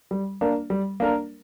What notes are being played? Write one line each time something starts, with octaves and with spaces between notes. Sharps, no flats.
G3
A#3 D4 A#4
G3
A#3 D4 A#4